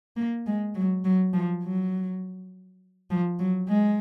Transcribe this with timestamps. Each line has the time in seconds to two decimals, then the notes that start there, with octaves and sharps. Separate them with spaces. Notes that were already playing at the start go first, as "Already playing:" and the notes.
0.16 A#3
0.47 G#3
0.75 F#3
1.04 F#3
1.33 F3
1.63 F#3
3.10 F3
3.39 F#3
3.68 G#3